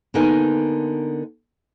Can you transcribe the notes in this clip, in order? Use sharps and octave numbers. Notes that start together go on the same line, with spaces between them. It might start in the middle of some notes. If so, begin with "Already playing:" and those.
D3 A#3 B3 D#4 A#4 G#5